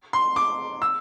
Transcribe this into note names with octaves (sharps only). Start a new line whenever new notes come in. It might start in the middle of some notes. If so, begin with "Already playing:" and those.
C6
D6
E6